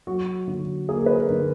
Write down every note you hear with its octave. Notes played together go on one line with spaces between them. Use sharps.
F#3 F#4
D3 F#4
A#3 G#4
B4
A#4
D3